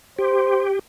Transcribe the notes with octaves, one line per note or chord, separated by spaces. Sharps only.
G4 C5